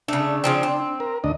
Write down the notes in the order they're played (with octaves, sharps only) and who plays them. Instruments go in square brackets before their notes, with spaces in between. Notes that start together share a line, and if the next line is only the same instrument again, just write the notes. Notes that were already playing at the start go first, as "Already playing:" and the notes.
[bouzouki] C#3 A3 [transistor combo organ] D4
[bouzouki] C#3 F3 C4
C4
[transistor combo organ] A#4
D2 D4 D#5